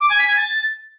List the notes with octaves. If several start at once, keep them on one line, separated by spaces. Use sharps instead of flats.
D6
G#5
B6
G#5
A6